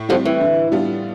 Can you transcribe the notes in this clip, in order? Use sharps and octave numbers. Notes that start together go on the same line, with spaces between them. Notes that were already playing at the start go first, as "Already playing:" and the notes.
Already playing: A2
D3 F3 G3 C4 G4
E3
D3
G3 B3 D4 F4